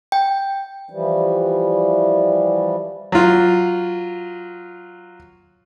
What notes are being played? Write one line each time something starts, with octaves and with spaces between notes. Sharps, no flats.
G5
E3 F3 G3
F#3 F4